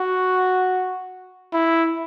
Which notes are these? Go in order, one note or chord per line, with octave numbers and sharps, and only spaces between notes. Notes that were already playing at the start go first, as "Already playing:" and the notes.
Already playing: F#4
E4